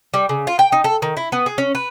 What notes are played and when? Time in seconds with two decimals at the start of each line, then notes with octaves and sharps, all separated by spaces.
0.14 G3
0.29 C#3
0.47 F4
0.59 G5
0.72 D#4
0.84 A4
1.02 D#3
1.17 E4
1.32 B3
1.46 G#4
1.58 C#4
1.75 B4